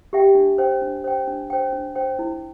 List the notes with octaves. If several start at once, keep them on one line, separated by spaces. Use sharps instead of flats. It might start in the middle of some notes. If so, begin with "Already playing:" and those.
G4 E5 G5
D4
C5 G5
D4
C5 G5
D4
C5 G5
D4
C5 G5
E4